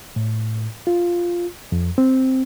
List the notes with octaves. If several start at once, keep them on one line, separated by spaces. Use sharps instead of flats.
A2
F4
F2
C4